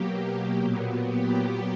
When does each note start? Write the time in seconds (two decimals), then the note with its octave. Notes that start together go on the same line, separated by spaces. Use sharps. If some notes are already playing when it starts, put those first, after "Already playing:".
Already playing: B2 F#3 A#3 G4
0.60 A#2 F#3 B3
1.05 G4